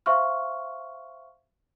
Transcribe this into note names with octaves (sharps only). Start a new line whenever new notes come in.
C5 E5 F5 C6 C#6 F6